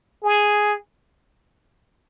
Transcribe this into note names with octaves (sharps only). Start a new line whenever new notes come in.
G#4